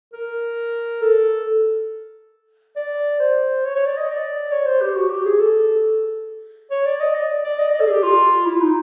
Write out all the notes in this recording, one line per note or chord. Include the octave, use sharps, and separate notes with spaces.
A#4
A4
D5
C5
C#5
C#5
D5
D#5
D5
C#5
C5
G4
F#4
G4
G#4
A4
C#5
D5
D#5
D5
D5
D#5
D5
A4
G#4
G4
F4
E4
D#4